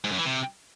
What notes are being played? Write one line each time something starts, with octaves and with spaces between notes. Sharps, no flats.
G#2
F#2
E3
C3